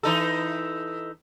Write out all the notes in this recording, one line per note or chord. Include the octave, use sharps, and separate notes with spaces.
E3 D#4 A4